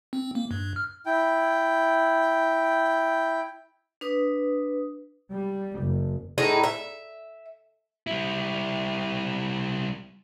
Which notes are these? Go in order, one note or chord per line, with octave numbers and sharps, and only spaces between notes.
C4
A#3
G2
F6
E4 G5
D4 B4 D#6
G3
F#1
A2 D#4 E4 G#4
E5
G3 E4